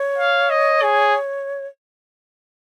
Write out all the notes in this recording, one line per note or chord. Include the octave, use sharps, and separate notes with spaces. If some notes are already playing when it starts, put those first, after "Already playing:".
Already playing: C#5
F5
D#5
G#4